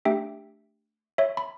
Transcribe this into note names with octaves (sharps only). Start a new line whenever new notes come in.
A3 D4 G4 E5 G5
C#5 E5
B5